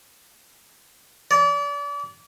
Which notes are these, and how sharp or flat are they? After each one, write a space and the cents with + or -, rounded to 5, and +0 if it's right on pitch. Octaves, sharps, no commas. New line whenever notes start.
D5 -35